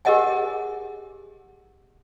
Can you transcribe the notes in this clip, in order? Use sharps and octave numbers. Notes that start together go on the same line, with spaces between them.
G4 G#4 A#4 D#5 F#5 G#5